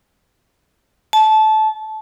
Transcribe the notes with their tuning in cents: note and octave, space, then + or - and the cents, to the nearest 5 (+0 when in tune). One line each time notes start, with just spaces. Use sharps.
A5 -20